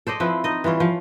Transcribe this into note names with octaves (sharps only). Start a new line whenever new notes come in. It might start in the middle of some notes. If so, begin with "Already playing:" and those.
A4 C5 D5 D#5
F3 C4 E4 B4
D#4 D#5
E3 G3 F4 C#5
F3